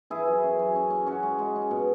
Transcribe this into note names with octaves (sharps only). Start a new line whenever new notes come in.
E3 E4 G#4
F#2
C#4
F#2
C#4
C#4
C#4 F#4
G#3
G#3
C#4
B2